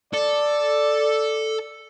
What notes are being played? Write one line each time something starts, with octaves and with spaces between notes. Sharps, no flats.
A4 D5